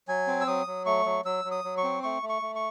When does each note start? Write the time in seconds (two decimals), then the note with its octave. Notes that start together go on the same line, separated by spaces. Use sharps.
0.08 F#3 G#5
0.27 C4
0.41 E6
0.47 F#3 D#6
0.67 F#3
0.86 A3 C#6
1.06 F#3
1.25 F#3 E6
1.45 F#3
1.51 D#6
1.64 F#3
1.78 C#6
1.83 C4
2.03 A3 C#6
2.23 A3
2.29 C#6
2.42 A3
2.55 C#6